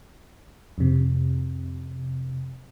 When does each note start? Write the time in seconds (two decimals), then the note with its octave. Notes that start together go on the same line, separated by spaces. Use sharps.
0.78 F2 C3